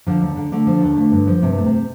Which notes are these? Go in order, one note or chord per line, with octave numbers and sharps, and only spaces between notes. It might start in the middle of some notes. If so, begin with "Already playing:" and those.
D3 F3 D4
D#2
D3
D3 A3 D4
F3
D#2
A3
G2
F3
G2 C3 C4
A3
C3 C4